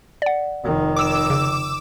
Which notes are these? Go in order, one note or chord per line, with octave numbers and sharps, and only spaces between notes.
D5 F#5
F1 D#3
D6 E6 E7
C#3